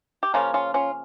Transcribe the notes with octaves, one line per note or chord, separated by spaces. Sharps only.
G4
C#3 F3 A#3 C#4 F4
C#4 F4
C#4 F4